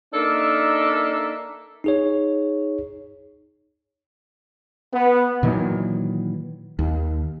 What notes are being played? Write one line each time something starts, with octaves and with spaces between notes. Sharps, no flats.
A#3 D4 D#4 A4 A#4 E5
D#4 G#4 C#5
B3
A#2 D#3 E3 F#3
D#2